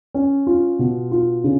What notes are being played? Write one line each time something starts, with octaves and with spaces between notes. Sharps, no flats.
C#4
F4
B2
F4
C#3